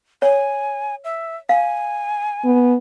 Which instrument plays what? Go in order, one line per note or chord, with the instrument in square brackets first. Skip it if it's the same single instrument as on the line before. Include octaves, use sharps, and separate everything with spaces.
[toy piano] C#5 [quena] G#5
[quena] E5
[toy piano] F5 [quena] G#5
[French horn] B3